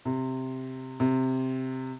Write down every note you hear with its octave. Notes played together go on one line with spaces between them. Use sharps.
C3
C3